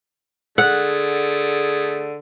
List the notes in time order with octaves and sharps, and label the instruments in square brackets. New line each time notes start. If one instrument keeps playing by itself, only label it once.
[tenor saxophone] D3 [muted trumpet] A3 [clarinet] G#4 [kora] F#5